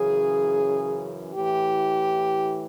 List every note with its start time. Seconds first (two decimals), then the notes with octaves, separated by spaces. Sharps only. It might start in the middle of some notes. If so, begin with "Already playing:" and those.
Already playing: F#2 C#3 E3 G#4
1.34 A2 E3 G4